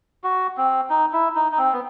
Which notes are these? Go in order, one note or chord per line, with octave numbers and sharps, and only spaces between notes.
F#4
C4
D#4
E4
D#4
D#4
C4
B3